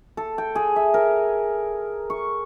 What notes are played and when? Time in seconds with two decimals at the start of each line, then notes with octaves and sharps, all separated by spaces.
0.17 A4
0.38 G5
0.55 G#4
0.76 E5
0.94 A#4
2.10 C#6